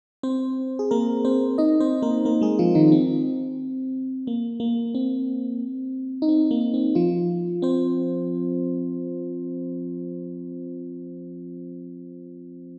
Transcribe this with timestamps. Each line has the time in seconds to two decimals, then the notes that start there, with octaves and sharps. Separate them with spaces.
0.23 C4 C5
0.79 G#4
0.91 A#3 A#4
1.25 C4 C5
1.58 D#4 D#5
1.80 C4 C5
2.02 A#3 A#4
2.25 A#3 A#4
2.41 G#3 G#4
2.59 F3 F4
2.75 D#3 D#4
2.88 D#4
2.92 C4
4.27 A#3
4.60 A#3
4.95 C4
6.22 D#4
6.29 C4
6.51 A#3
6.74 C4
6.95 F3 F4
7.62 C4 C5